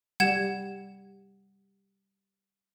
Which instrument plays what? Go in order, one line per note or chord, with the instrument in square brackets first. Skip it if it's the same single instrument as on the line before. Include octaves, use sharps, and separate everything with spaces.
[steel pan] G3 G4 [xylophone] F#5 G#6 E7